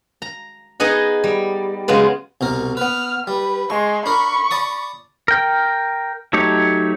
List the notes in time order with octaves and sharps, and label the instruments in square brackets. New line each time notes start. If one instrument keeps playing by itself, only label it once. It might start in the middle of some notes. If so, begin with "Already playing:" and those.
[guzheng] A#5
B3 D#4 G#4 D#5 F#5
G3
C#3 F#3 G#3 B3 F4
[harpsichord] C2 B2 A#4
[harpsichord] B3 B4 [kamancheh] F6
[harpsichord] G3 [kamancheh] B4
[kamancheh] G#3 C6 [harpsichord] C#6
[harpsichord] D4 A#4 [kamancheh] B5 C#6
[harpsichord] D5 A5 D#6
[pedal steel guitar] A#4 G5
F#3 A3 D#4 G4 C#5